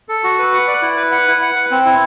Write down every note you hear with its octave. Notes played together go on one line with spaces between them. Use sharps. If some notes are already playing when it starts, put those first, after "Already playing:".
A4
F#4
B4
F#5
D5
E4
B4
F#5
E4
F#5
B4
C4
E4